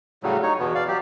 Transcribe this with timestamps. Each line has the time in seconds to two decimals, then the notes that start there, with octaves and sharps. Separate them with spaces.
0.23 A2 C#3 F#3 G3
0.43 D#4 C#5
0.59 E2 B2 B3
0.75 D5 F5
0.88 F#3 G4